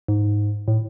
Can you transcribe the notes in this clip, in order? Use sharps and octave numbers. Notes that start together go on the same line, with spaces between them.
G#2
A2